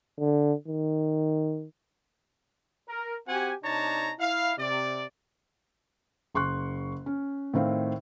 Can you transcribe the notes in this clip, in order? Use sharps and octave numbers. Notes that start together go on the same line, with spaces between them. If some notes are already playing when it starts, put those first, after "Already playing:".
D3
D#3
A#4
C4 F#4 G4 F#5 G#5
C3 D4 D#4 C#5 A5 A#5
E4 F5
C3 D5
F#1 C6 C#6 F#6
C#4
A2 D#3 C4 F5